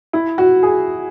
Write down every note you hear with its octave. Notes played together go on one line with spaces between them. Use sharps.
E4
F#4
G#4